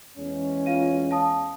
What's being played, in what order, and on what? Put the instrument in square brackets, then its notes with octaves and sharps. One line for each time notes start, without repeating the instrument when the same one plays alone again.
[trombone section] E2 G#3 C#4
[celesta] F4 F5 D#7
F5 A5 D#6